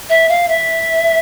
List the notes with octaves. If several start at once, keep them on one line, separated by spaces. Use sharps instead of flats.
E5
F5
E5